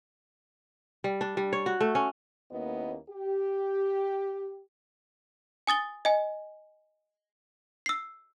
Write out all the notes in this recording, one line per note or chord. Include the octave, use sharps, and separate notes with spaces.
G3
D4
G3
C#5
F#4
A3
C#4
D#2 A#3 B3 C#4 E4 D#5
G4
G#5 D#6 A6 G7
D#5 G#5
E6 C7